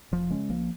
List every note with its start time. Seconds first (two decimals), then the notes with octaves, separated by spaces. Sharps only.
0.12 F1 F3
0.30 C#3 G#3 C#4
0.49 A#1 F3 A#3